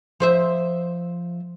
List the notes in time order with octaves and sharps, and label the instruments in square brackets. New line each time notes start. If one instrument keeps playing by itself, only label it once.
[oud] F3 C5 E5